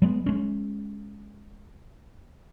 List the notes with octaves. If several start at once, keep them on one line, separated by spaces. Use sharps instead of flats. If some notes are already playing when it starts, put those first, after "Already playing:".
F#3 G#3 B3
G#3 C#4